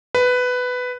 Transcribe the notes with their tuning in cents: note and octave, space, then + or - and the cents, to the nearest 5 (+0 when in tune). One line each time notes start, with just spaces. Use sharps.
B4 +10